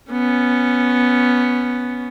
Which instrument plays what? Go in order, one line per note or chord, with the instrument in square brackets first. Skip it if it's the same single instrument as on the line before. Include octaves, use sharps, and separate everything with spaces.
[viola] B3 C#4